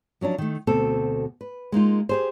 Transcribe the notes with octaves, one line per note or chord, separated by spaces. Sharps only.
F3 F#3 C#4 D4
D#3 A3
D2 B2 C4 A4
B4
G#3 A#3 D#4 F4
G4 G#4 C5